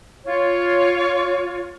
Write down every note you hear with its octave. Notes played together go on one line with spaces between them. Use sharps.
F4 C#5